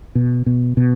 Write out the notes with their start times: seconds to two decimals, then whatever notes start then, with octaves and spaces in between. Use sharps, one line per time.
0.15 B2
0.46 B2
0.77 B2